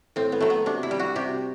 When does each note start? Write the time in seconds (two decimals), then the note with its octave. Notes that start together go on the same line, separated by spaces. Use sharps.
0.16 A2 C4
0.32 B3
0.40 F#3 A3
0.50 B3
0.66 C3 D4
0.83 E4
0.91 G3
0.99 F#4
1.16 C3 G4